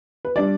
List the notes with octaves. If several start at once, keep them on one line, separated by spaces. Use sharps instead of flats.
B4
G3 D4 D5